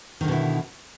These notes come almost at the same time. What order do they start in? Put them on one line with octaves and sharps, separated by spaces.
D#3 D3 B2 E4